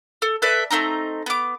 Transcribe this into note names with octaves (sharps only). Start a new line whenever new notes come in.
A4
A4 B4 D5 E5
A3 C4 D#4 A#5
B3 D6